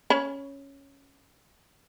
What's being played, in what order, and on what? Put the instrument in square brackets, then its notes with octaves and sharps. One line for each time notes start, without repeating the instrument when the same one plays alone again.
[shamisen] C#4 C#5 B5